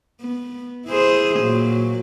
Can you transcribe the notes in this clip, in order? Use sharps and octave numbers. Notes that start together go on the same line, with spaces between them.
B3
E4 G#4 C5
A#2 F#3